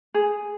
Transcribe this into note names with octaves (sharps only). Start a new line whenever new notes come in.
G#4